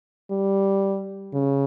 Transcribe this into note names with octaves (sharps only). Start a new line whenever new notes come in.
G3
C#3